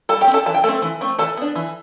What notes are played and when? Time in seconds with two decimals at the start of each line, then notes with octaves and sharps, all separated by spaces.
0.09 G3 A4 A5
0.21 G4 G5
0.27 C4
0.34 A4 A5
0.46 E3 A5
0.54 G5
0.63 A3 C4 A4 A5
0.82 E3
1.01 A3 C4
1.19 E3 A4 A5
1.37 B3 D4
1.55 E3